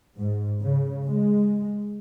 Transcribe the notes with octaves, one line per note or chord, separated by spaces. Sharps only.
G#2
C#3
G#3